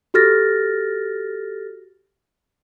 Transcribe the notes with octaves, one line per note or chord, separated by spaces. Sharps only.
F#4 G4 A4 F6 A6 A#6